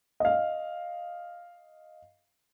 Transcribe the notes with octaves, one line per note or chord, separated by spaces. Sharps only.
D#5 F5